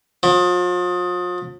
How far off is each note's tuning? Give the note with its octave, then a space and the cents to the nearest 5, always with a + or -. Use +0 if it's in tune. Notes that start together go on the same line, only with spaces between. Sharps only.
F3 +40